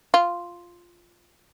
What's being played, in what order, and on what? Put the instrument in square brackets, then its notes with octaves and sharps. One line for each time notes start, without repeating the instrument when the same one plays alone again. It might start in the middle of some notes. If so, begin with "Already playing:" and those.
[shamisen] F4